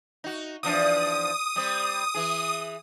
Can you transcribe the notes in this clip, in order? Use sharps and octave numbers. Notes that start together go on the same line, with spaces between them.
D#4 F#4
E2 F3 D4 D#6
G3 C4
E3 G#4